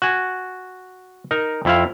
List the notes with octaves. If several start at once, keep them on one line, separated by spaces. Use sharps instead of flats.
F#4 G#5
D#4 A#4
F2 E4 F5